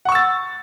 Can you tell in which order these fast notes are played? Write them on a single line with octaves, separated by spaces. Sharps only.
F#5 C#6 E6 A6